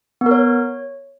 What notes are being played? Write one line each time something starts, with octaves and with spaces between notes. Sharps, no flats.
B3
A#4
C#5